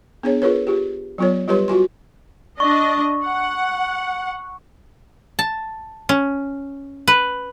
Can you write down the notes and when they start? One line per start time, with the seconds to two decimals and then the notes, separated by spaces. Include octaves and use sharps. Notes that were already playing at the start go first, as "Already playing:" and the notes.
0.23 B3 D4 G#4 C#5
0.42 F4 G#4 A#4 B4 C#5
0.67 F4 G4
1.18 F#3 B3 F4 A4 C#5
1.48 G3 F4 G4 B4 C#5 C6
1.68 F4 F#4 G#5 C6
2.60 D4 D#5 C#6
3.25 F#5
5.39 A5
6.09 C#4
7.08 B4